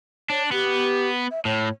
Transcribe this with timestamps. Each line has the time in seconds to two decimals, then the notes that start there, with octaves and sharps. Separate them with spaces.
0.30 D4 C#5
0.52 B3 G4
1.31 E5
1.45 A2 C#5